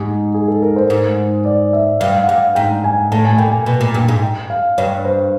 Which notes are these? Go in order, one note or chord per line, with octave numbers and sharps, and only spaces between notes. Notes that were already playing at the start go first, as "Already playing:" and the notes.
Already playing: G#2 G4
G#4
A4
A#4
C5
G#2
D5
E5
G2 F5
F#5
G2 F5
G#2 G5
G#5
A2 A5
G#5
A#2 G5
G#5
B2
A#2
G2
G#2
G5
F5
G2 C#5
C5